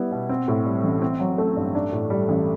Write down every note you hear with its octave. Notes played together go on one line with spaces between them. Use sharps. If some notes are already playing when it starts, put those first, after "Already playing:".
Already playing: G3 B3 E4
B2
C4
A2
G3
A1
C4
F#3
A3
G2
D4
A2
G3
A1